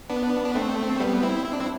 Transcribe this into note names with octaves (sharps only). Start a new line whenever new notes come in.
B3 D4
D4
A3 C4
G3 B3
C4 E4
E4
D4
C4 E4